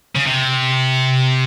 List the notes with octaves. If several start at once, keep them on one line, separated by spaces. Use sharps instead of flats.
C#3
C3